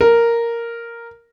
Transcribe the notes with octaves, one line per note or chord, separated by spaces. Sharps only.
A#4